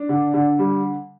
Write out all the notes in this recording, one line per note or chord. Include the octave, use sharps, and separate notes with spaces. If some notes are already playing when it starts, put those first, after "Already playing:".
Already playing: D4
D3
D3
G3